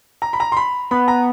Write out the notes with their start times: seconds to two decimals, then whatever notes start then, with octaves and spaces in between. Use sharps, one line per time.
0.22 A#5
0.33 B5
0.40 A#5
0.52 C6
0.57 B5
0.91 B3 B5
1.08 A#5